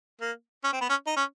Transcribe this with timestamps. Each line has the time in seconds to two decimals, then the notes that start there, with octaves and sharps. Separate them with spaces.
0.21 A#3
0.64 C#4
0.73 C4
0.81 B3
0.90 C#4
1.07 D#4
1.17 C#4